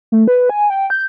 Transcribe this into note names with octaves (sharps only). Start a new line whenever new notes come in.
A3
B4
G#5
G5
G6